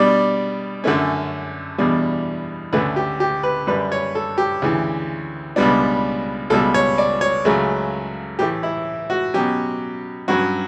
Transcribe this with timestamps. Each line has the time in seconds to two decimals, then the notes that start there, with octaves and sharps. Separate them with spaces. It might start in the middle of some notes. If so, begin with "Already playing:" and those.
Already playing: B2 G3 D4 D5
0.84 F#2 D3 A3 C#4
1.78 E2 B2 G3 D4
2.73 D2 D3 A3 C#4 B4
2.96 G4
3.20 G4
3.43 B4
3.67 F#2 D3 G3 D4 B4
3.92 C#5
4.15 A4
4.38 G4
4.62 D2 C#3 E3
5.56 C#2 B2 G3 B3 D4
6.50 C#2 B2 G3 A4
6.74 C#5
6.98 D5
7.21 C#5
7.45 C#2 C#3 F#3 A3
8.39 A2 E3 A3 G4
8.63 E4
9.10 F#4
9.34 B2 F#3 C#4 G4
10.28 G2 F#3 C#4 F#4